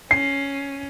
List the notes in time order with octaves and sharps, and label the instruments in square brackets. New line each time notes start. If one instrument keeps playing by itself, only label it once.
[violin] C#4 [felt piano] C7